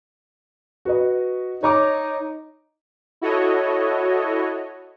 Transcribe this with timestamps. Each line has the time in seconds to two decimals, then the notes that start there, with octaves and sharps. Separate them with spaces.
0.85 F#4 B4 D#5
1.63 D#4 C#5 A#5 D6
3.21 E4 F#4 A4 C#5 D#5